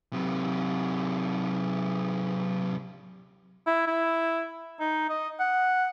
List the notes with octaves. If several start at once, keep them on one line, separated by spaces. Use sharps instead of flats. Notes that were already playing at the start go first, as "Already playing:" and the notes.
C3 F#3
E4
E4
D#4
D#5
F#5